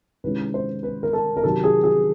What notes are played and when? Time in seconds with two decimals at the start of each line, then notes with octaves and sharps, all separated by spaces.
0.24 C3 D#3 G#3 C#4 E4 B4
0.54 C5
0.83 B4
1.03 A#4
1.13 A4
1.37 A#4
1.44 C3 D#3 F#3 A4
1.64 G#4
1.84 G#4